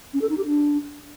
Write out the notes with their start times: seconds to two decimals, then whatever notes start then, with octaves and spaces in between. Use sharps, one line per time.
0.13 C#4
0.21 A4
0.29 D#4
0.37 G4
0.45 D4